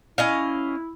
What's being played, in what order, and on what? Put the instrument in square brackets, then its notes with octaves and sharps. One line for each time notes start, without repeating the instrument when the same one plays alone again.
[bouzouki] C#4 D#5 F5 [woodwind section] E4